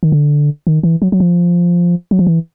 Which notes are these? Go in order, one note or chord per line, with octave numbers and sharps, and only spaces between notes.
D#3
D3
D#3
E3
F#3
F#3
F3
F#3
F3
E3